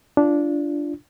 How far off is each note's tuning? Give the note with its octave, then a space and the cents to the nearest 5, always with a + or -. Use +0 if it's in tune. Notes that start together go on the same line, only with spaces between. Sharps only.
D4 -10 F4 -30